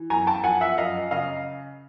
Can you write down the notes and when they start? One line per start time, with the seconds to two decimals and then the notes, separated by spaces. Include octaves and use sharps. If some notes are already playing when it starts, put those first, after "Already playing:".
Already playing: E3
0.10 F#2 G#5 A#5
0.27 G5 A5
0.44 F3 F#5 G#5
0.61 E5 F#5
0.78 F#2 D#5 F5
1.11 C#3 D#5 F5